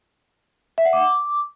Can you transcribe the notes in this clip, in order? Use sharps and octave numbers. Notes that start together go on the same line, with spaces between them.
E5
F#5
D6